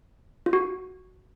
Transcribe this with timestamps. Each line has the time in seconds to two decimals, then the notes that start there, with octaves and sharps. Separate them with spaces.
0.46 F4
0.53 F#4